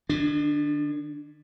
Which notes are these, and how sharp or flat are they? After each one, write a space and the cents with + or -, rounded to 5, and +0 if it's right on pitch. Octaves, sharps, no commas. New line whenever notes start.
D#3 -45 D4 +0